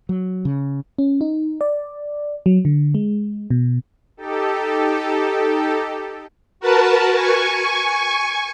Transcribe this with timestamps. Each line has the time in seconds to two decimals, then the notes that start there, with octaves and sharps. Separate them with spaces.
0.09 F#3
0.45 C#3
0.98 C#4
1.21 D#4
1.61 D5
2.46 F#3
2.65 D3
2.95 G#3
3.50 B2
4.17 D#4 G4 A4
6.60 F#4 A#4 B4 A5
7.14 G#5 C#6